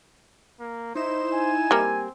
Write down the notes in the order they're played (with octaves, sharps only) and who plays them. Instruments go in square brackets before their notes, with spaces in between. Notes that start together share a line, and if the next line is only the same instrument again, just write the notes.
[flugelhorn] A#3
[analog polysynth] D#4 E4 E7 [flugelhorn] C5
[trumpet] G#5
[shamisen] G3 A#3 [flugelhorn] C4